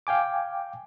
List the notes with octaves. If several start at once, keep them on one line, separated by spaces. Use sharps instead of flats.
F5 G5 G#5 D6